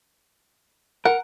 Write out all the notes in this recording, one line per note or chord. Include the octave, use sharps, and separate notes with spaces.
A#4 F#5